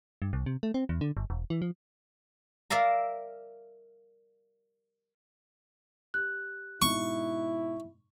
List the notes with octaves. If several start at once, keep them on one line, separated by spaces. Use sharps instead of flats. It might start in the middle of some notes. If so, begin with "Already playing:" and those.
G2
C2
C3
A3
C4
E2
D3
G1
E1
E3
F3
A#4 D5 E5 F5 A#5
G4 F#6
G#2 B2 D#4 E4 C#6